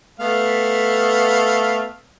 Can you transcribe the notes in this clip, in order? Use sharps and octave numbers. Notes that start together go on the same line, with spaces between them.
A3 B3 F5